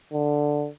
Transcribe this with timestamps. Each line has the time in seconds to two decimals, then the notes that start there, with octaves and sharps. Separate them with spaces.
0.13 D3